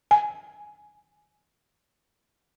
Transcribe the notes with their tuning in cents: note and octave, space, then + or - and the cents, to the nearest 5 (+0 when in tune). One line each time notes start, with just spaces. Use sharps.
G#5 +10